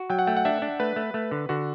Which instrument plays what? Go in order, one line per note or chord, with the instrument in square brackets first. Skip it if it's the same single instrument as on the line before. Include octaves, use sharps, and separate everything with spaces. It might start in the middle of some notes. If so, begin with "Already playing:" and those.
Already playing: [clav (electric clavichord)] F#4
[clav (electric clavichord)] F#3 [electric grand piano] G5
[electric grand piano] F#5
[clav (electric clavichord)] A3 [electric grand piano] G5
[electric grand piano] F#5
[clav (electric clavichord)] D4 [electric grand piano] E5
[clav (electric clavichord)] D4
[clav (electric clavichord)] A3 [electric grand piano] B4
[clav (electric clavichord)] A3
A3
D3
[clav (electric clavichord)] D3 [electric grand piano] F#4